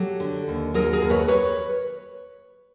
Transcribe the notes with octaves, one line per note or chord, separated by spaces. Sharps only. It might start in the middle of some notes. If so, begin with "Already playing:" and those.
Already playing: F#3 G4 A4
D3
D#2
F#3 G#4 A#4
G#4 A#4
D#2
B4 C#5
B4 C#5